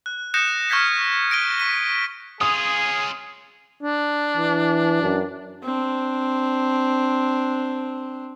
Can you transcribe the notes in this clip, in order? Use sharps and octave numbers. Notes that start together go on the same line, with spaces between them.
F#6
D#6 F#6 G6 A#6 C#7 E7
C#6 F6 G6 G#6 B6 E7
A#6 D7 D#7 G7
C#6 B6 D#7 G7
C#4 F4 G#4 D#6
D4
E3
F#2
C4 D4